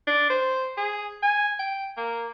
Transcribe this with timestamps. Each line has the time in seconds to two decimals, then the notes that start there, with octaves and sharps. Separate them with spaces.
0.07 D4
0.30 C5
0.77 G#4
1.23 G#5
1.59 G5
1.97 A#3